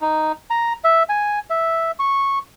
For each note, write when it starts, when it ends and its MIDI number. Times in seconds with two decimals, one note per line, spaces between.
0.01 0.32 63
0.50 0.73 82
0.84 1.03 76
1.09 1.39 80
1.50 1.91 76
1.99 2.39 85